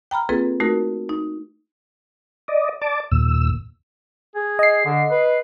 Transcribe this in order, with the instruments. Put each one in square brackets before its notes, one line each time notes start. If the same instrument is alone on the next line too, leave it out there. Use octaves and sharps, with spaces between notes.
[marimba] G5 A#5 B5 F6
A#3 C4 F4 G#4 A4 B4
A3 D#4 F#4 A#4
D#4
[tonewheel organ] D5 D#5
D5 A5 D6
D#2 A#2 E6
[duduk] G#4
[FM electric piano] D#5 C7
[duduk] D3
B4